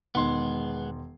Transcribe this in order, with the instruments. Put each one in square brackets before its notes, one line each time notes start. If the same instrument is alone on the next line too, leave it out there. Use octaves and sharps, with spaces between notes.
[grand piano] E1 D#3 C6 [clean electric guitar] G#3 B3